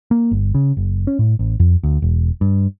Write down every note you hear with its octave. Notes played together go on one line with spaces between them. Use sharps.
A#3
G1
C#3
F#1
C#4
A2
A1
F2
D2
E1
G2